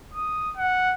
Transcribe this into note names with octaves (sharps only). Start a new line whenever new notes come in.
D#6
F#5